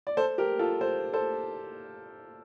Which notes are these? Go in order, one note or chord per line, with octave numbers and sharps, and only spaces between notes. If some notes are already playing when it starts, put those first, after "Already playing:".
D5
A4 C5
G4 A#4
F4 A4
A4 C5
A4 C5